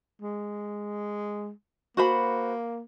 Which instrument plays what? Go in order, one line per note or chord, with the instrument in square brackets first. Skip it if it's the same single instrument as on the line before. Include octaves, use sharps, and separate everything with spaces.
[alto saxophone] G#3
[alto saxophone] A#3 [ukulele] F#4 C5 B5